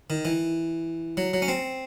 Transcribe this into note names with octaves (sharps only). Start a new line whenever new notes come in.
D#3
E3
F#3
F#3
C#4
C4